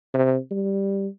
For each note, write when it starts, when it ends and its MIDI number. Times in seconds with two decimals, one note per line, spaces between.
0.14 0.37 48
0.51 1.07 55